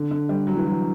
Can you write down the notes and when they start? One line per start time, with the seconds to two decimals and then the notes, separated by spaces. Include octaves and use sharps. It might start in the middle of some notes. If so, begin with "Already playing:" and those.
Already playing: D3
0.11 D3
0.29 G3
0.47 F#3
0.57 E3
0.67 F#3